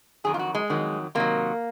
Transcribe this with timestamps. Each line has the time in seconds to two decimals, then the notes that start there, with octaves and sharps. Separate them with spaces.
0.24 F2 D#3 F#3 G#4
0.34 F4
0.39 F#4
0.55 G#3
0.70 F2 D#3 F#3
1.15 C3 D#3 F#3 A#3